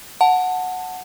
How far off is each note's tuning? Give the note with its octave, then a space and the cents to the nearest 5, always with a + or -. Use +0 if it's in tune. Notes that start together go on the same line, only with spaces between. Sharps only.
F#5 -10 A5 +10